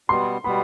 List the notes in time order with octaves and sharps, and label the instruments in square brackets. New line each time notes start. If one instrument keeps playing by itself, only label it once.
[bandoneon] B2 G3 B3 [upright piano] C6
[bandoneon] B2 G3 B3 [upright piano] B5